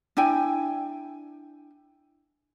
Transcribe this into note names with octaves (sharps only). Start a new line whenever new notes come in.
D4 E4 G5 G#5